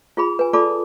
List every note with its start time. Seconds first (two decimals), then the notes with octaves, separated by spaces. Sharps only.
0.17 F4 G#4 B5
0.39 B4 G#5
0.53 F4 A4 D5 A5 B5 D6